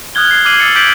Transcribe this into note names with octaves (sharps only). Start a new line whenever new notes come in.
D#6 F6 F#6 G#6 G7
C7
D6 F6 G#6 C7 D#7 F#7
E6 A6 C#7
D6 G6 G#6 B6 D7 F#7